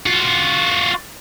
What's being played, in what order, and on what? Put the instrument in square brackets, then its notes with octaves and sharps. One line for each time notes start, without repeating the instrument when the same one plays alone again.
[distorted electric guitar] F4 F#4